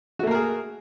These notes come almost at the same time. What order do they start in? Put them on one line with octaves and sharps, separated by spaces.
F#4 A3 A#3 A#4 G#4